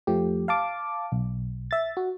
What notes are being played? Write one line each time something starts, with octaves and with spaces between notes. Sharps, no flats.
F2 F3 A3 G4
F5 A5 D6
B1
E5 A6
F#4